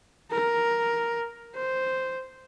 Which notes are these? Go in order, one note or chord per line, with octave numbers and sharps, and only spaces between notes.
A#4
C5